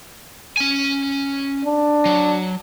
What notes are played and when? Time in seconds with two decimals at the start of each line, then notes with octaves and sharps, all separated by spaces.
0.57 C#4 G#5
1.65 D4
2.05 F#3